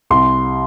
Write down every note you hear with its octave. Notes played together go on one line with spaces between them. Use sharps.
C2 C6